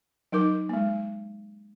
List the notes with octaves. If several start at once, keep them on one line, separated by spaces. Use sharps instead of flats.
F#3 D#4 A#4 D6
G#3 A#3